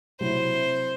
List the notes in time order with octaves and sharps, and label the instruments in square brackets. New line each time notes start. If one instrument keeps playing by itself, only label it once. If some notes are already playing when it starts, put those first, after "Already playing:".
[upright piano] C3 F#3 C4 E4 [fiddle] C5